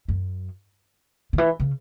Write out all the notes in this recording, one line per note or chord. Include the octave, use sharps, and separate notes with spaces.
F#2
D3
E3
C#3